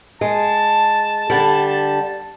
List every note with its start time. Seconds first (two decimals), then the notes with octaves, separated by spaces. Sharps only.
0.21 G#3 A5
1.30 D3 G3